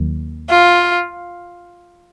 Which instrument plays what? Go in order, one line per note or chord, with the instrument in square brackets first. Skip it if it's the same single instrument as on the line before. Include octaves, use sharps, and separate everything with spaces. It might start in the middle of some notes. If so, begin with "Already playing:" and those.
Already playing: [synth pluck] D#2 D#3 F#3 A#3
[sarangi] F4